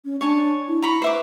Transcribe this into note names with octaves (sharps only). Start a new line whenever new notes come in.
C#4
D4 C#5 G#5 A5
E4
E4 A#5 B5 C#6
B4 C5 E5 D6